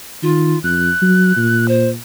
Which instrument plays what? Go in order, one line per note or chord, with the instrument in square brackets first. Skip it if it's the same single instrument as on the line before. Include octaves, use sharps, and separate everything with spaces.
[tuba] D#3 [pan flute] F4
[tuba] F2 [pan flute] F#6
[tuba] F#3
A#2
[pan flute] C5